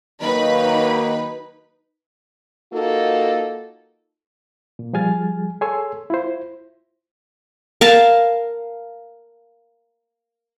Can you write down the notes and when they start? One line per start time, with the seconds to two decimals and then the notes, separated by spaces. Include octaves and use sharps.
0.21 D#3 F#3 A#3 D#4 B4 B5
2.73 A#3 D#4 F4 F#4 A4
4.79 A#2
4.93 F3 G3 G#4 G#5 F6 A6
5.61 G#4 A4 C#5 G#5 C6 E6
6.10 E4 F4 C5
7.81 A#4 F5 A5